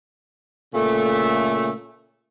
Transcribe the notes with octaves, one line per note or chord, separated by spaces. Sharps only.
A#2 C#3 A3